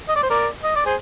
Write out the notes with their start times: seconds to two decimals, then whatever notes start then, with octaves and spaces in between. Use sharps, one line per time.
0.09 D#5
0.16 D5
0.23 C5
0.30 A#4 D5
0.64 D#5
0.75 D5
0.86 G#4 C5